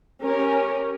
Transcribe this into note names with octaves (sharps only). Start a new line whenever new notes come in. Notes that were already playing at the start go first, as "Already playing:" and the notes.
C#4 G4 A#4